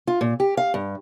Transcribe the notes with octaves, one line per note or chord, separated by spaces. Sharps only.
F4
A#2
G4
F5
G2